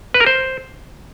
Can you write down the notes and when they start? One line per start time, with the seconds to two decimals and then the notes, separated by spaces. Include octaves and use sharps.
0.14 B4
0.20 A#4
0.26 C5